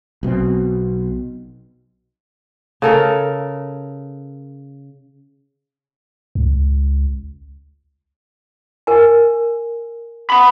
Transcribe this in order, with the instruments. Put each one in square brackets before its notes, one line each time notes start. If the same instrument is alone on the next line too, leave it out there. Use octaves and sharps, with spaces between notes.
[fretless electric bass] B1 B2 G3 C4
[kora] C#3 A4 A#4
[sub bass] C#2
[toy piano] A#4 G#5
[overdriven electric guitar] F#5 B5